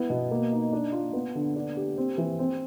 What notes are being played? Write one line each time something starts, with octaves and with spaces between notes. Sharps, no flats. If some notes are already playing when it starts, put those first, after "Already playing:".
Already playing: B3 E4
B2
A#3
D#4
D4
F4
B3
D3
D4
G4
C4
E3
C4